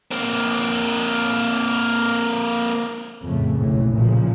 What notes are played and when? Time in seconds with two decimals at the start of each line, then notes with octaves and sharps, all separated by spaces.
0.11 A#3 C4
3.22 F2 A2 C#3 A3
3.57 F#1 B1 A2 C#3 E3
3.91 A#2 C#3 E3 F3